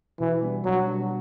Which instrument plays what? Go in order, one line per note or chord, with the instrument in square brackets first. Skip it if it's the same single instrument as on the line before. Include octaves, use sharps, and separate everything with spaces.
[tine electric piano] B2 [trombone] E3
[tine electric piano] G3 B3 D4
[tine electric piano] B2 [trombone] F#3
[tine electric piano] G3 B3 D4